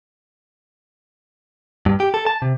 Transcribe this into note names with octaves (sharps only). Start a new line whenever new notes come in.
G2
G4
A4
A5
C3